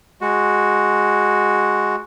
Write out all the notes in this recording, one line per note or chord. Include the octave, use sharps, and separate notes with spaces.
G#3 F#4